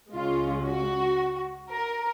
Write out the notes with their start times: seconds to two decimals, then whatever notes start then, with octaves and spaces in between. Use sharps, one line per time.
0.14 C#2 C#3 G#3 C#4 F4
0.66 F#4
1.71 A#4